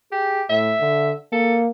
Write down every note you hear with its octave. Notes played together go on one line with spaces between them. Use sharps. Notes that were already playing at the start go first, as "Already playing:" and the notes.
G4 G#4
A2 E5
D3
A#3 A4